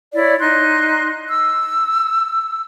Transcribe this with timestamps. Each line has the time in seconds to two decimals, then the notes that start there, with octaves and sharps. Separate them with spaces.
0.14 E4 C#5 D5
0.40 D#4 C6 F#6
1.28 E6